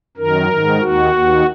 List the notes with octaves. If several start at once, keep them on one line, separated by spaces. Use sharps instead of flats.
F#2 D#3 A#4
G#2 D#3
D#2 D#3 F#4
D#2 D#3